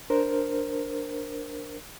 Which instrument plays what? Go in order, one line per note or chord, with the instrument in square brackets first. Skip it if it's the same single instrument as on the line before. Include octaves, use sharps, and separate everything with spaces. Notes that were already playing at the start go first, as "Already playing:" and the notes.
[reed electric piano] D4 A#4 C5